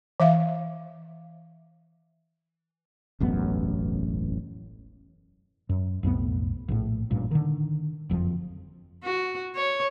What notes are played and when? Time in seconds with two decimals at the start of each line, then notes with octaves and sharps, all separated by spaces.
0.20 E3 E5 F5
3.20 E1 A1 F#2 B3
5.69 F#2
6.03 B1 F2 A2 B3
6.69 A#1 A2
7.11 A1 G2 A#2
7.31 D3 D#3
8.10 F#1 F2 G#2 F3
9.04 F#4
9.55 C#5